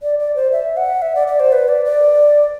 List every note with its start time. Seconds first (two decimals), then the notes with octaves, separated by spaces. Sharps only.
0.03 D5
0.19 D5
0.36 C5
0.52 E5
0.77 F#5
1.02 E5
1.15 D5
1.28 D5
1.40 C5
1.52 B4
1.68 D5
1.85 D5